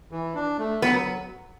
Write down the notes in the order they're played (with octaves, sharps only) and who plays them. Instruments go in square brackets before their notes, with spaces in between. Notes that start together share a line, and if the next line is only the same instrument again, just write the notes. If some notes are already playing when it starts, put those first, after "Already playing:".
[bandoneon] E3
D4
A3
[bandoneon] F#3 [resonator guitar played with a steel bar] B3